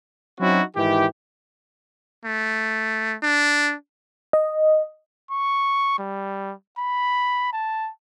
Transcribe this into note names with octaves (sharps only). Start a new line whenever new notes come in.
F#3 C4 C#4 D#4 E4 F#4
G#2 D#3 E3 E4 G4
A3
D4
D#5
C#6
G3
B5
A5